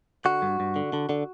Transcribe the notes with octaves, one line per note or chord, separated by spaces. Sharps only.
D3 F#4
G2
G2
D3
D3
D3